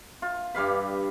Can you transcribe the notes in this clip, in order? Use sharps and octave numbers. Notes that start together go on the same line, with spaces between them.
F4
G2 G3 F5 B5